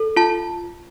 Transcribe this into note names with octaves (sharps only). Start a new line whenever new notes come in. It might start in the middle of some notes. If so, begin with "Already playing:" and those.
Already playing: A4
F4 A5